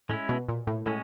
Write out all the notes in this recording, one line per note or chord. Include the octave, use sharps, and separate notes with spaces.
A2 G#3 C#4 E4
B2
A#2
A2
A2 G#3 C#4